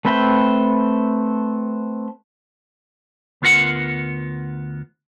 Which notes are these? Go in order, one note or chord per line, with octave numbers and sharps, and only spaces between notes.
A3 C4 B4 E5 G5
D2 B3 F4 A#4 F#5